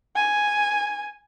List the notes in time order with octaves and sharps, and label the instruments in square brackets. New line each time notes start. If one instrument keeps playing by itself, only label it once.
[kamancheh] G#5